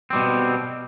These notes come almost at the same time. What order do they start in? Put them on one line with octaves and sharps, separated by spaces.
C4 G3 B2